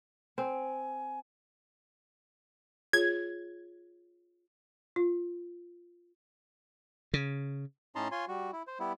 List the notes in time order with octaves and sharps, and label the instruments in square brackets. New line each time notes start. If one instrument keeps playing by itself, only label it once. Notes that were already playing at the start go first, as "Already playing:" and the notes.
[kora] C4 [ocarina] G#5
[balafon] F4 G#4 C#5 [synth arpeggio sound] G#6
[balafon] F4
[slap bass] C#3
[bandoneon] A2 C#4 D#4 A5 A#5 C6
F4 C#5 G#5 C6
G3 F#4
E4
C5
G3 B3 E4